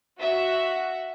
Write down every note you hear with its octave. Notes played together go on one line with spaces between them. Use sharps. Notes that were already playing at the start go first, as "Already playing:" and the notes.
F#4 E5